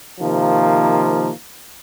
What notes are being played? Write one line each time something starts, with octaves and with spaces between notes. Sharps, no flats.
C3 D#3 F3 A#3